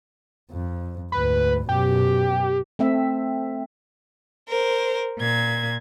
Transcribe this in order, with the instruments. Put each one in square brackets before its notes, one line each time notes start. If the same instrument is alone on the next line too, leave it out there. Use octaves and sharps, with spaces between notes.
[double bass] F2
[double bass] D2 G#2 [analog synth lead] B4
[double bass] F#2 B2 [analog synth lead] G4
[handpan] A3 C4 E5
[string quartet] A#4 C5
A#2 G#6